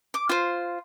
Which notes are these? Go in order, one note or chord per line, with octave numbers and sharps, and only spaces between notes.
D6
F4 C5